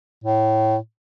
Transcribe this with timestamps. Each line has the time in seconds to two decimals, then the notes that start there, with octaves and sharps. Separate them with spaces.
0.24 A2